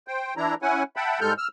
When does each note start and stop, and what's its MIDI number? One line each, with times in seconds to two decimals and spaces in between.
0.08 0.34 72
0.08 0.34 79
0.37 0.55 52
0.37 0.55 62
0.37 0.55 64
0.37 0.55 82
0.62 0.83 61
0.62 0.83 64
0.62 0.83 78
0.62 0.83 80
0.96 1.20 76
0.96 1.20 78
0.96 1.20 79
0.96 1.20 81
0.96 1.20 83
1.21 1.33 44
1.21 1.33 55
1.21 1.33 56
1.21 1.33 69
1.21 1.33 89
1.21 1.33 91
1.38 1.48 88
1.38 1.48 89